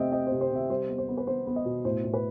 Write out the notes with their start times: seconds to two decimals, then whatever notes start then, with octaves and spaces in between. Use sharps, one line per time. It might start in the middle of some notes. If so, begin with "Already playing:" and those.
Already playing: C3 A3 C4 D#5 E5 G5
0.12 C4 D#5
0.27 C5
0.32 C3
0.41 C5
0.51 C3 E5
0.70 G3 C5
0.89 B3
0.98 C5
1.08 B3
1.17 B4
1.27 B3 C5
1.47 B3
1.56 D#5
1.65 B2
1.85 A2 C5
2.04 A2
2.14 B4